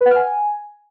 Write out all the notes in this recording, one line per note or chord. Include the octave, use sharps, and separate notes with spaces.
B4
F#5
F6
G#5